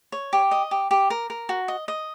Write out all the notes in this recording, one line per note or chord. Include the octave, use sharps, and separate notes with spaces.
C#5
G4
D#5
G4
G4
A#4
A#4
F#4
D#5
D#5